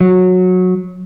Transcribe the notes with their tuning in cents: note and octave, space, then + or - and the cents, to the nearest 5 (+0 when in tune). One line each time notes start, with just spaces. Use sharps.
F#3 -15